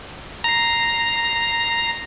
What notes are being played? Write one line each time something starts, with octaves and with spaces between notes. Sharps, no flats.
A#5 C7